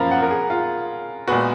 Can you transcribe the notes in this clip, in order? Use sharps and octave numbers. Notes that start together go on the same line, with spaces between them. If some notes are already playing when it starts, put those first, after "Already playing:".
Already playing: F#2 F3 A#3 F4 A#5 B5
F#5
A#4
G#4
F4
A#2 G#3 B3 F#4